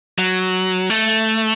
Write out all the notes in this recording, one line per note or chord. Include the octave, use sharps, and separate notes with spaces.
F#3
A3